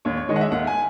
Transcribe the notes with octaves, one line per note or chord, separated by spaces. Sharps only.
D#2 C#5
C#5
D#3 G#3 D#5
F#5
E5
D#2 F#5
G#5